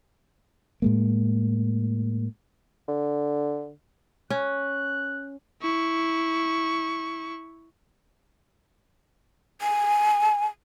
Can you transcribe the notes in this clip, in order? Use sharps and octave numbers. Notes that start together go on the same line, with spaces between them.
A2 G#3 A#3
D3
C#4 F#6
E4 C#6
G#5